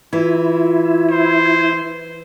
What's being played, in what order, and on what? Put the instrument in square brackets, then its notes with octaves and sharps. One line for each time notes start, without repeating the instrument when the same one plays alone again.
[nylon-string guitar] E3 [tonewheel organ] E4 [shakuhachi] F4
[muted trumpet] C5